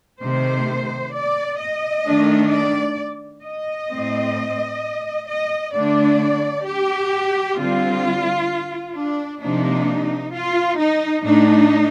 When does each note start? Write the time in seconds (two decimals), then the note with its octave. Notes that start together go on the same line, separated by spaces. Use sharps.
0.22 C3 D#3 A3 C5
1.14 D5
1.60 D#5
2.05 D#3 A3 D4
2.51 D5
3.43 D#5
3.89 A2 A3 C4
5.28 D#5
5.73 D3 A3 D4 D5
6.66 G4
7.56 D3 G3 C4 F4
8.94 D4
9.40 C3 F3 A#3 D4 D#4
10.33 F4
10.79 D#4
11.24 A2 A3 D4 D#4